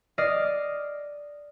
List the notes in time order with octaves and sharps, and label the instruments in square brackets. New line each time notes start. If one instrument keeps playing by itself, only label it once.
[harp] D5 D#5 F6 C7